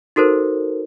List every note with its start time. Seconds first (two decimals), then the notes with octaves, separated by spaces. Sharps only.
0.16 D#4 F#4 A4 A#4 C5